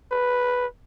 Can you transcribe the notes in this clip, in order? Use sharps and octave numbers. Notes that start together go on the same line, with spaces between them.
B4